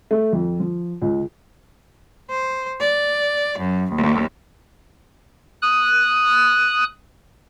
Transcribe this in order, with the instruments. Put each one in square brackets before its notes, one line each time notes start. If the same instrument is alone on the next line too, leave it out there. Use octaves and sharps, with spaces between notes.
[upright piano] A3
F2
F3
C#2
[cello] C5
D5
F#2
D#2
[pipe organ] D#6 F#6